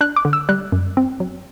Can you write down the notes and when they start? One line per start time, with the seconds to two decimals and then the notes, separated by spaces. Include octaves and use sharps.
0.01 D4 F#6
0.16 D6
0.25 D3
0.33 E6
0.49 G3 F#6
0.72 F#2
0.97 C4
1.20 F#3